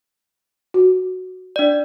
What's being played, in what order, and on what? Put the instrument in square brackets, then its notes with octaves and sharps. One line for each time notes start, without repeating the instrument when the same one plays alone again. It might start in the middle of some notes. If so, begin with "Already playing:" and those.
[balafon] F#4
[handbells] D4 D5